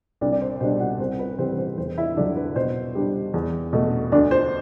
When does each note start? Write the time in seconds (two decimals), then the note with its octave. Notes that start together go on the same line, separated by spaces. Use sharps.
0.21 C2 D4 D5
0.32 D5
0.41 C5
0.60 B2 G3 D4 C5
0.80 F#4 F#5
1.00 C2 C5
1.19 B4
1.38 C3 E3 G3 C4 C5
1.58 C5
1.78 E2 C5
1.98 E4 E5
2.17 D3 F#3 D4 D5
2.36 B4
2.56 B2 C5
2.95 G3 D4
3.34 E2
3.73 B2 A3
4.12 D2 D4 D5
4.31 C5